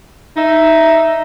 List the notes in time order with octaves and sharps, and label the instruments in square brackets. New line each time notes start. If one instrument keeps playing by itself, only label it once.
[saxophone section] D#4 E5